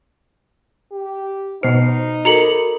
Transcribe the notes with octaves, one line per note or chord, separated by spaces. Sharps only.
G4
B2 D#4 C5 C7
F#4 A4 A#4 A#5 C#7 F#7